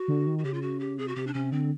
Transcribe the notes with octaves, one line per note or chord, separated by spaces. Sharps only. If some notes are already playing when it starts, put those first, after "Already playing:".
Already playing: F#4
D3
D#3
F#4
C#3 G4
F4
F#4
G4
C3 G#4
F#4
C3 G4
D4
C3 C#4
D3 C4